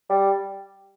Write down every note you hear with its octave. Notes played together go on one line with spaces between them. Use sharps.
G3